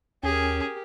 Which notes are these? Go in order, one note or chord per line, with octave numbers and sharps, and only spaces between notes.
D#2 C#4 G4 G#4 A#4